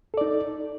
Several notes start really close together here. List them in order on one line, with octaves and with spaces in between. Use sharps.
A4 D5 D#4